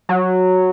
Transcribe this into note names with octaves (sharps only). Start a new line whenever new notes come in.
F#3